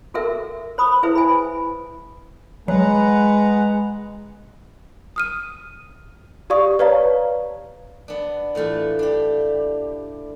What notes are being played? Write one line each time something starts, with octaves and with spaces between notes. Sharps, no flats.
F#4 A4 A#4 E5
C5 B5 D#6
E4 G#4 B4 C5 E5
G#5 B5
F#3 G#3 B4 F#5 A#5
D#6 F6 D#7
G4 D5 F5 C#6 D#6
B4 C#5 D5 F5 A5 A#5
B3 D4
A2 E3 A3 F4
D4 G4